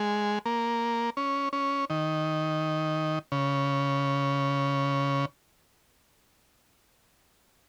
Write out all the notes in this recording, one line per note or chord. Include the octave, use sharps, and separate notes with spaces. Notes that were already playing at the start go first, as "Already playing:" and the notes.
Already playing: G#3
A#3
C#4
C#4
D#3
C#3